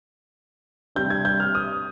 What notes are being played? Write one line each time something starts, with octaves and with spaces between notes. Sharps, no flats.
C3 G3 D4 G6
G#6
G6
F6
D#6